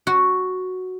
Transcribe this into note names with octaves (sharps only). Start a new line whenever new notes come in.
F#4